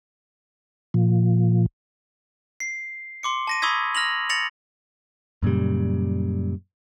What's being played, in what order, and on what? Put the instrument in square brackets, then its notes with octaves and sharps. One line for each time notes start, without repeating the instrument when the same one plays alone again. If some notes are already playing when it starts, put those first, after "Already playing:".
[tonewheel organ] A#2 F3
[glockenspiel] C7
C6 D6 C#7
A5 A#6 D#7
B5 C#6 D#6 E6 G#6 B6
F6 A#6 F7 F#7
A6 A#6 C#7 F7 F#7
[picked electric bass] F#2 A#2 C#3 G3